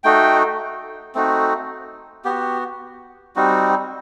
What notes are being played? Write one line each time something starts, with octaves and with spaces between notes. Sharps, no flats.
A3 D#4 F#4 G5
A3 C4 D#4 F#4
B3 F#4 G4
G3 C4 D#4 F#4